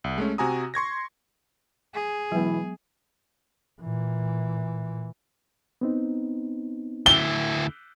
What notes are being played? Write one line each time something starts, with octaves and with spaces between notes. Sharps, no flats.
C2
G#3 A3 C#4
C3 F#4 G#5 A#5 D#6
C6 C#6 G#6 A#6
G#4
B2 E3 F#3 G#3 B3
A#2 E3
B3 C4 D#4
D2 E4 G7